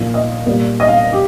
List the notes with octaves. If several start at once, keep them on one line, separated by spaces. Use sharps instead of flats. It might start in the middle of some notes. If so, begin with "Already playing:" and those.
Already playing: A#2 F3
D#5
A#2 G3
D#5
F5
G4